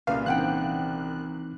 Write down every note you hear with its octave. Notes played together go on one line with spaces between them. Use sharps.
C2 A#2 C#3 B4 F5
E3 C4 D#4 C5 F#5 G5 F#6